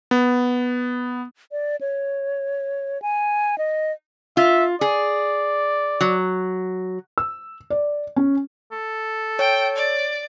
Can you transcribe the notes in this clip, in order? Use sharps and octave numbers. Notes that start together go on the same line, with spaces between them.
B3
D5
C#5
G#5
D#5
F4 E5
G#4 D5
F#3
E6
D5
C#4
A4
C#5 G5
D5